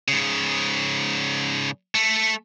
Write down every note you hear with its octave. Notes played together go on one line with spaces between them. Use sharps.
G#2 C#3
A3